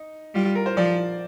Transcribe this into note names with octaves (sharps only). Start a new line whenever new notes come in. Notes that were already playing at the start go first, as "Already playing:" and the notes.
Already playing: D#4
G3 F4
F4
A#4
C5
F3 D5